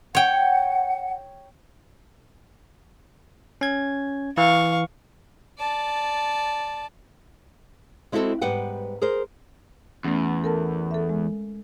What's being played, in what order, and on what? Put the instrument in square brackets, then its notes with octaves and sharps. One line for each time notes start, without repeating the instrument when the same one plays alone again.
[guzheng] C#5 G5 [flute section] F#5
[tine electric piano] C#4 G#6
[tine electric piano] E3 [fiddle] F5 C#6
[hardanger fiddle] D5 A5
[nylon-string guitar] G#3 C4 E4 F#4 G4 A4
G#2 G3 B3 B4 F#5 G5
G#4 A#4 C5
[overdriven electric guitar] E2 [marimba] A3 C#4
[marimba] A4 A#4 A5
A4 E5
G#3